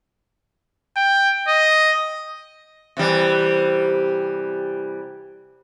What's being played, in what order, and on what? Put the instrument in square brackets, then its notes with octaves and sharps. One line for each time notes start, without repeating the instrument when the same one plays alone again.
[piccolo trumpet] G5
D#5
[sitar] C3 E3 G3